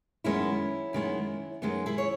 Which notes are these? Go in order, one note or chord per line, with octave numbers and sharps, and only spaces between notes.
F#2 D#3 G#3 B3 C#4 E4
F#2 D#3 G#3 B3
F#2 D#3 G#3 B3
E4 G#4
C#5